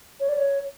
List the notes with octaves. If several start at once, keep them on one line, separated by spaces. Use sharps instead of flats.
C#5
D5
C#5